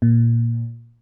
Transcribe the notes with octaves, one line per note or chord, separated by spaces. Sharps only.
A#2